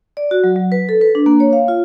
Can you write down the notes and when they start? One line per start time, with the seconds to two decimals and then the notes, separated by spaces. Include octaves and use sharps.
0.17 D5
0.31 F#4
0.44 F#3
0.56 F#3
0.72 B4
0.89 A4
1.01 B4
1.15 D4
1.26 A#3
1.40 C#5
1.53 F5
1.68 F4